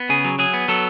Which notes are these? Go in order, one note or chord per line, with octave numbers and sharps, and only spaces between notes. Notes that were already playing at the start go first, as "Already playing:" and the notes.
Already playing: B3
C#3 G#4
F#3
F#3 G#4
B3
F#3 A4